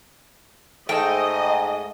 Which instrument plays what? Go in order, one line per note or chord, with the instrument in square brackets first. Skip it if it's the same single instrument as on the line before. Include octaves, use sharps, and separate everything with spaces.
[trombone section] G#2 [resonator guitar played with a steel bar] A3 A4 [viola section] D#5 [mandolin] G5